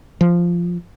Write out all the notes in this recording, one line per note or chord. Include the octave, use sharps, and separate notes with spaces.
F3